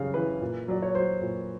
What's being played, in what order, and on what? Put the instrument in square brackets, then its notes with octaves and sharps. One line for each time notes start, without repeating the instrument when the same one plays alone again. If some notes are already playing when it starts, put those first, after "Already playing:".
Already playing: [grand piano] F#2 C#3 G3 F5
E3 B4
A#2
F#3 D5
C#5
F#3 C5
A#2